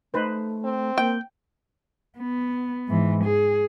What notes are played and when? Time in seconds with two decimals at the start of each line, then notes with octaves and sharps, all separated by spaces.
0.14 A3 D#4 B4 C5
0.65 C4
0.98 A#3 G5
2.18 B3
2.88 G#2 E3
3.24 G#4